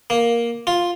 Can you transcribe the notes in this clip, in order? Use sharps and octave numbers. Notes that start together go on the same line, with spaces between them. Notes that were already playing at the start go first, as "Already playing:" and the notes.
A#3
F4